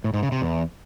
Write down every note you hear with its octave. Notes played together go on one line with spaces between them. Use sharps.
A2
G#2
C#3
C3
E2